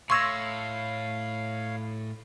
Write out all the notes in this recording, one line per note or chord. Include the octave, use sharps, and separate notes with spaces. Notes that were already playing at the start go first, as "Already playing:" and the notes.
A2 C#5 F5 C6 C#6 E6 G#6 A#6